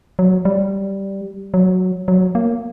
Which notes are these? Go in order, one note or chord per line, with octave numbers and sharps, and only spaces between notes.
F#3
G3
F#3
F#3
A#3